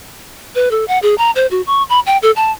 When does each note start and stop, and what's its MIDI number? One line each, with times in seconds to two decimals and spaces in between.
0.55 0.69 71
0.71 0.85 69
0.88 0.99 78
1.02 1.15 68
1.18 1.31 82
1.36 1.47 72
1.51 1.62 66
1.67 1.83 85
1.89 2.00 83
2.06 2.18 79
2.22 2.31 69
2.36 2.51 81